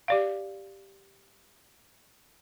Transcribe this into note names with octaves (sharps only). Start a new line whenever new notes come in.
G4 D5 F5